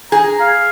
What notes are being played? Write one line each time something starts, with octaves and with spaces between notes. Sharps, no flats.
G#4 A#5
F5